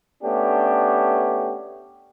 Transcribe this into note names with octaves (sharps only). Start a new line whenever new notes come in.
A3 B3 C#4 D4 G4